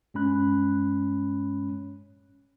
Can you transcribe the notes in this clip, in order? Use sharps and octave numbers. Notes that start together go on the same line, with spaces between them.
G2 G#3 C#4 B5 F#6